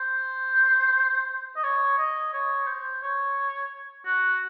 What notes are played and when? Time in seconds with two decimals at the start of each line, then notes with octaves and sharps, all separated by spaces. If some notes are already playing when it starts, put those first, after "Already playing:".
Already playing: C5
1.56 D#5
1.64 C#5
1.98 D#5
2.34 C#5
2.67 C5
3.03 C#5
4.06 F#4